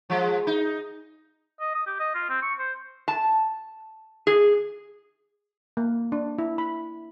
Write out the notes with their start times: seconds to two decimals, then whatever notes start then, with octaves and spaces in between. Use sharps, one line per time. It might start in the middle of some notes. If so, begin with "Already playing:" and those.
0.10 F3 G#3
0.47 D#4
1.60 D#5
1.75 D#6
1.87 G4
2.00 D#5
2.15 F4
2.30 C4
2.42 C#6
2.59 C5
3.08 A5
4.27 G#4
5.77 A#3
6.12 D4
6.38 E4
6.58 B5